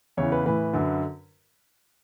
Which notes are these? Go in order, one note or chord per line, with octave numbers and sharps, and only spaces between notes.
E2 C#3 E3 C#5
B4
A2 E3 B4
F#2 D3